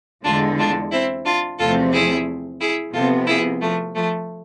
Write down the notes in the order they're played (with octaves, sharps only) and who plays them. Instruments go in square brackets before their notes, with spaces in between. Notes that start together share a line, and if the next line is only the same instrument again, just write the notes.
[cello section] E2 D3 G#3 [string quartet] D4 F4
[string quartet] D4 F4
C4 E4
D4 F4
[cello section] E2 C3 F3 A3 C4 [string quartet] F4 A4
[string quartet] E4 G#4
E4 G#4
[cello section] C3 F3 B3 [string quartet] F4 A4
[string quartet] E4 G#4
F3 A3
F3 A3